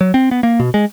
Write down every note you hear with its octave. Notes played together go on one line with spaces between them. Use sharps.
F#3
C4
B3
A#3
B2
G#3